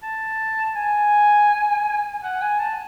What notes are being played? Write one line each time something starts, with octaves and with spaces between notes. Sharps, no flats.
A5
G#5
F#5
G#5
A5